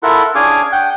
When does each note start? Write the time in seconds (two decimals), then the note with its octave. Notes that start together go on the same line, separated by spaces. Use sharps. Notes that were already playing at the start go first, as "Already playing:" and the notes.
0.03 E4 F4 A4 A#4 E5 F#5
0.35 C#4 D4 G#4 F5 G#5 D6
0.72 F#5 G5